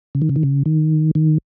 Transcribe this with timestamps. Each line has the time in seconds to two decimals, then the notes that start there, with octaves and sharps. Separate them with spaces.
0.15 C#3
0.22 D#3
0.29 C#3
0.36 D#3
0.43 C#3
0.66 D#3
1.15 D#3